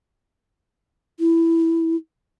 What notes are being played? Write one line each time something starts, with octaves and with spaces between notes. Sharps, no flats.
E4